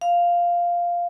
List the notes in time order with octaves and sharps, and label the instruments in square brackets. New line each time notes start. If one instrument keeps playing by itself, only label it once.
[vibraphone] F5